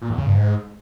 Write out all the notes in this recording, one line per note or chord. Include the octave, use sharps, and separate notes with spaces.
A#2
E2
C#3
G2
G#2